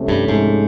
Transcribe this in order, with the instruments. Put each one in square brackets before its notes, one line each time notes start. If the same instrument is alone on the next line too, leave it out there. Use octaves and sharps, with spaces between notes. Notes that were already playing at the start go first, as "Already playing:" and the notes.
Already playing: [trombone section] C2 C3 F3 A3 C#4
[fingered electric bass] G2
G#2